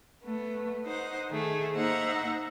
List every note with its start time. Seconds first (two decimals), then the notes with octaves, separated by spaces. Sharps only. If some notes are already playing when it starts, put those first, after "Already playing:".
0.23 A3 B3
0.85 D#4 C5 F#5
1.30 D#3 A3 G#4
1.74 A#3 D#4 C5 E5 F#5 A#5